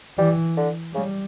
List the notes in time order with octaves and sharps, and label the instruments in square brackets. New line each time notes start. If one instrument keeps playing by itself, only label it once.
[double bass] E3 [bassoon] G3
[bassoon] D3
[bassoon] C#3 [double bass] G3